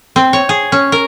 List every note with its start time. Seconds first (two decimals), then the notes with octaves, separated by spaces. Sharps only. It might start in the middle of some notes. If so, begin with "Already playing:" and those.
0.16 C4
0.33 C#5
0.49 G#4
0.72 C#4
0.92 A#4